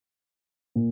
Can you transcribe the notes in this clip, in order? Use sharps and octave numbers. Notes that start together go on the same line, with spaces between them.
A#2